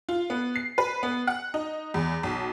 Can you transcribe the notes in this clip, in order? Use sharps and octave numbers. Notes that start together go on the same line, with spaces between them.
F4
B3
C7
B4
B3
F#5
D#4
E2
B1